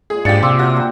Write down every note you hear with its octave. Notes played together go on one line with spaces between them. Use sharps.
A#2 G#3 G#4
G#2 D4 F4 G4 A6 C#7
C3 C6 D6 E6
D4 F#4 E5 G5
A#3 G4